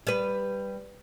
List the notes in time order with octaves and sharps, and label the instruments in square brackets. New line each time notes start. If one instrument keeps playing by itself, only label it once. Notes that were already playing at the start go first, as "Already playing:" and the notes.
[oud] G3 B4